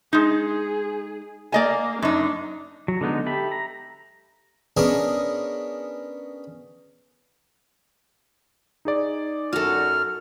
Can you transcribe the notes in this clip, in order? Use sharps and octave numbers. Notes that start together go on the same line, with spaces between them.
G#3 D#4 G#4
A#3 D5 D#5 G#5
F#2 D4 D#4
F#3
D3 G#3 B3 D#4
G4 A4 E5 B5
A#5
B3 C#4 D4 G#4 A#4 D#5
D#4 G#4 D5
F#2 F#4 A4 F6